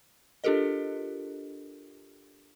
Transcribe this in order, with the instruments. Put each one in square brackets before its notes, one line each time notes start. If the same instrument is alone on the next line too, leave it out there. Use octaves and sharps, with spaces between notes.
[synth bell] D4 F4 G4 A4 A#4 D#5